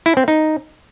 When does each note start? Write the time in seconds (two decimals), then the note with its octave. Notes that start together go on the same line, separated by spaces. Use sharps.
0.06 E4
0.17 C4
0.28 D#4